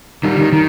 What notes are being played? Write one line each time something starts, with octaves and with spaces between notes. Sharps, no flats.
D#3 G3
D#3
D#3